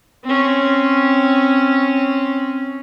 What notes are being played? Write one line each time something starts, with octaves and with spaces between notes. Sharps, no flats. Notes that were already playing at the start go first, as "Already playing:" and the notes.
C4 C#4